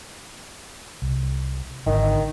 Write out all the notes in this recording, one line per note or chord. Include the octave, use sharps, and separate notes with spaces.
C2
G#1 D3 D#3